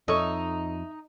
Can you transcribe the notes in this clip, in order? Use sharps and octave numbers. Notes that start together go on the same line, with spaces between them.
F2 D#4 A4 C#5 E5 C#6